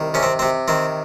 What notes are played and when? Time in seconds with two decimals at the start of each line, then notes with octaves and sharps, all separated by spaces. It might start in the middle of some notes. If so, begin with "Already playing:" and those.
Already playing: C2 D#3
0.14 C3 C#4
0.23 C4
0.39 C3 C4
0.68 D#3 C4